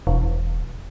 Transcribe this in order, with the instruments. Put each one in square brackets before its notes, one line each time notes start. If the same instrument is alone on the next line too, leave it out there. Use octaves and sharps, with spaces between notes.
[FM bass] E1